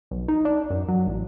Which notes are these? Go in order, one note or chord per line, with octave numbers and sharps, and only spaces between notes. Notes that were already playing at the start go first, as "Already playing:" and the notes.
B1
D#4
D4
F#2
F#3
A1